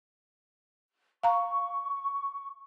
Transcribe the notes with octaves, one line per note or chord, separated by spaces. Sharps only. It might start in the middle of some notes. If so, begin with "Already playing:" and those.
F5 A#5 C#6